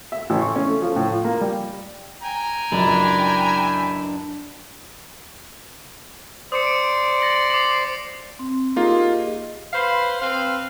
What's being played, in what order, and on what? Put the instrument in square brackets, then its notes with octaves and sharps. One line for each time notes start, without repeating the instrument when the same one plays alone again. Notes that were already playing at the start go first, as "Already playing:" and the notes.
[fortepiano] E5
A1
C#6
C#4
A3
F3
A2
F4
A#3
G3
[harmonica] G5 G#5 A#5
[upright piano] C#2 F#2 [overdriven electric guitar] D4 [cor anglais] E4
[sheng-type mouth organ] C5 D5 [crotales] D#6 C#7
[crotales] D7
A6 A#6 F#7
D6 C7 F#7
[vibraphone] C4
[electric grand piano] A#3 D#4 F4 [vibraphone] G4 G#4 D#5
[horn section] B4 C5 F5 B5 C6
C4 B4 C5 F5